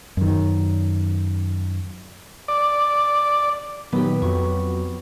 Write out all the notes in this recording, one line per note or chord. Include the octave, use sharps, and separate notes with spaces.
F#2 D#3
D5
A#2 D#3 F#3 B3 G4
F2 F#3 C#6